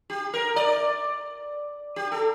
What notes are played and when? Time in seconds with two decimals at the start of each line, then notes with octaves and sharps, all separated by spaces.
0.10 G4
0.34 A#4
0.56 D5
1.96 G4
2.12 A4